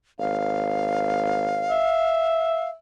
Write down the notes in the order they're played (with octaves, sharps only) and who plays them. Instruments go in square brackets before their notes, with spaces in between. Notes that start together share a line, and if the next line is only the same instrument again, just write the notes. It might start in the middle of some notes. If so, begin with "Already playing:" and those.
[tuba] G#1 [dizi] F5
[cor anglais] E5